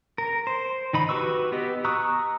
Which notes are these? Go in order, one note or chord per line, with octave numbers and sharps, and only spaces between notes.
A#4
C5
D#3 D#4 B5
F#4 G4 B4 C#6 E6
B3 G4 D#5
A#5 C#6 D#6 E6 F#6